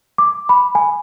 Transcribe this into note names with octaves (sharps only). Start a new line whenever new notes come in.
D6
B5
G#5